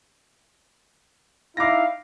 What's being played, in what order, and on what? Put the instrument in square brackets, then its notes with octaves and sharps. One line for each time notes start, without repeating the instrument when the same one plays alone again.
[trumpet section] D#4 E4 F5 [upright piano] D6 A#6